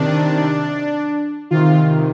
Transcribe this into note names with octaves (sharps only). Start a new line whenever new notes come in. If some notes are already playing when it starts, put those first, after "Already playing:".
Already playing: C3 D#3 D4
C3 D#3 F4